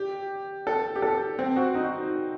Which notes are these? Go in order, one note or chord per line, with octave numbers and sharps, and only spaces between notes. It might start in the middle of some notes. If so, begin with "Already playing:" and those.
Already playing: G4
A4
G4
A4
C4
F#4
D#4
F#4